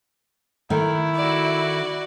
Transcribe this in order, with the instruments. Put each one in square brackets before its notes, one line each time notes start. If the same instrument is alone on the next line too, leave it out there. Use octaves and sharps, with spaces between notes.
[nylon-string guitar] D#3 A3 [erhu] E4
[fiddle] F#4 D5